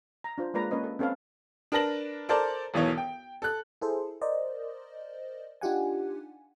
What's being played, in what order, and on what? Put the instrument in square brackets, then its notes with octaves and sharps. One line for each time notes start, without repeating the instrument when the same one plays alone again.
[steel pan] A#5
D4 F4 C5
G#3 A#3 F4 B4 D5 A#5
A#3 C#4 B4 C#5 D#5
A4
C4 C#4 A4 B4 F5
[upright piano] D4 A#4 B4 A5 A#6 F#7
A4 A#4 C5 D5 A5 A#5
E1 B1 E3 C#5
G5
A4 F#6
[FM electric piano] E4 G#4 A4 C5
A#4 C5 D5 D#5
D4 D#4 F4 G4 F#5 G#5